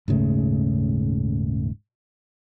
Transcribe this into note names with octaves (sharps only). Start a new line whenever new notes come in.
D#1 G#2 C#3 A3